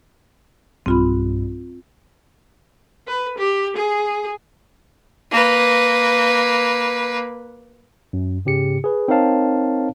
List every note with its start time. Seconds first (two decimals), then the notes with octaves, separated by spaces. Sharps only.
0.86 B1 G2 G3 C4 F4 B5
3.08 B4
3.38 G4
3.77 G#4
5.31 A#3 B4
8.13 F#2
8.45 G#2 C#3 G4 C#7
8.84 G#4 B4
9.08 C4 D#4 A#4 C#5 F5 A5